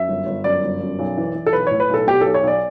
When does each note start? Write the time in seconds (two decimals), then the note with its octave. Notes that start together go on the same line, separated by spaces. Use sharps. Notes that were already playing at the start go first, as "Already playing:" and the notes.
Already playing: F#2 E5
0.08 G1
0.26 G1
0.44 F#2 D5
0.63 G1
0.81 F#2
0.99 B1
1.17 E3
1.35 E3
1.46 A4
1.53 B1 B4
1.67 A2 C#5
1.80 B4
1.89 B1 A4
2.07 B2 G4
2.21 B1 A4
2.34 C#5
2.43 B1 D5